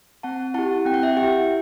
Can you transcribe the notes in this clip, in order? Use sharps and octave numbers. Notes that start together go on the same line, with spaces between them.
C4 F#5 A5
E4 G4 F#5 A5
C4 G5
F#5
E5 G5
E4 G4 E5 G5